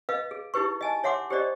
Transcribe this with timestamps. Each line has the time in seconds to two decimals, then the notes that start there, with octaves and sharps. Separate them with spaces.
0.09 B4 D#5 F5
0.31 G#4
0.54 D#4 E4 G4 B4 C#6
0.81 D#5 G#5 A5
1.04 C#5 E5 F#5 C6 D6
1.30 G4 C5 D5 D#5